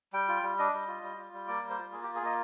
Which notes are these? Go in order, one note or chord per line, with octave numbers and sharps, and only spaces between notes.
G3 G5
F4
G3
D4 D#5
G3
F4
G3
F4
G3
A#3 D5
G3
C5
F4
A#3 G#4
G4
F4
G#4
A#3 D#5